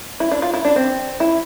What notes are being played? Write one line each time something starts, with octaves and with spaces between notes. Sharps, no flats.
E4
D4
F4
E4
D4
C4
E4